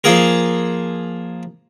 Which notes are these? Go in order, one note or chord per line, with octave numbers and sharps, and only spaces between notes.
F3 A#3 G#4 A#4